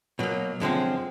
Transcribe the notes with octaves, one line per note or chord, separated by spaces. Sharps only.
B2 F#3 A#3
F#2 D3 F3 G#3 C4